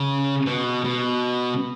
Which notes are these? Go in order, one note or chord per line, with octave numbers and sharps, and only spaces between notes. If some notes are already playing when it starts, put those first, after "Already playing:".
Already playing: C#3
B2
B2